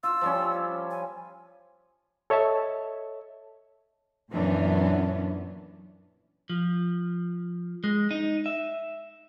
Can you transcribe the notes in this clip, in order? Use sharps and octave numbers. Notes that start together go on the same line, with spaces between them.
F4 E6
F3 G3 C#4
G#5
A4 C#5 D#5 E5 A5
F#2 A#2 E3 B3 C#4 D4
F3
G#3
D#4
E5